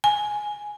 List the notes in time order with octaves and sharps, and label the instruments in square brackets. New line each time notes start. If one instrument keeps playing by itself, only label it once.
[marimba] G#5